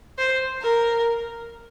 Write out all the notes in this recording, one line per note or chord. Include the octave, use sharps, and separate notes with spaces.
C5
A#4